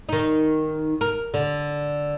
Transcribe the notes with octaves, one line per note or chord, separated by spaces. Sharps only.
D#3 D#4
A#4
D3